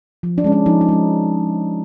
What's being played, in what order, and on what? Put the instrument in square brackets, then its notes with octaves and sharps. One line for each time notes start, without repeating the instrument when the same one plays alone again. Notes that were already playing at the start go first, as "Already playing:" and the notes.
[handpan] F3
D4
G#3 C#4
D4
F3 D#4
D#4
G#3 C#4